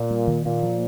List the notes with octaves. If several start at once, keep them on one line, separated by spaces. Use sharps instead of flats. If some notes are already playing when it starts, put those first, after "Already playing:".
Already playing: A#2
G3
D#3
A#2 A#3
F3